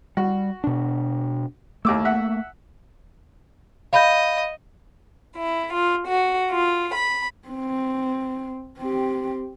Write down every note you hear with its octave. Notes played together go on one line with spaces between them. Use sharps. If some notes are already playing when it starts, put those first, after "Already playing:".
G3 F#4
B2 D4
D#2 A3 A#3 D6 E6
E5 F#5
D#5 F5 B5 G6
E4
F4
F#4
F4
B5
C4
C4 G4